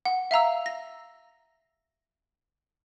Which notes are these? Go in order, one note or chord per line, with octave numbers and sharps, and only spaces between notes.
F#5
E5 F5 A#5 E6
A#6